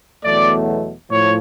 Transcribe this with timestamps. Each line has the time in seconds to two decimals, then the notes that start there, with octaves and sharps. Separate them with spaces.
0.24 E2 B2 F#3 A3 D5
1.09 A2 F3 C#5